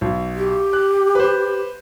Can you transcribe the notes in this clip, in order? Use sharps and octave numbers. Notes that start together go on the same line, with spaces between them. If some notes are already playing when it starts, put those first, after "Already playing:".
B1
G4
F#6
B4 C5